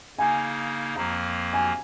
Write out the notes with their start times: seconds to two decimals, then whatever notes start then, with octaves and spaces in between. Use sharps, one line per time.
0.19 C#3 A#3 D#4 G#5
0.95 F2 F3 A#3 A#5
1.53 G#5